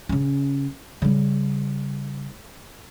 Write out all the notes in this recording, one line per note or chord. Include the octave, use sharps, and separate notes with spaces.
C#3 C#4
C#3 G3